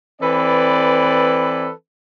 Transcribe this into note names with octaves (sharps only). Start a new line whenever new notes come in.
E3 C4 A4 B4 D5